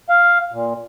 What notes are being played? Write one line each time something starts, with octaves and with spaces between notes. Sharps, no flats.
F5
A#2